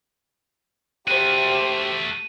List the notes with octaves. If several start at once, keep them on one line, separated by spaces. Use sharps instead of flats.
A3 F#4 G4 C5 D#7